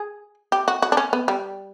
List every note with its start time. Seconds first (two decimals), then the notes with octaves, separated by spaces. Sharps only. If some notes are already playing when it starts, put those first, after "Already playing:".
Already playing: G#4
0.52 G4
0.68 F#4
0.82 F#4
0.92 D4
0.97 C#4
1.13 B3
1.28 G3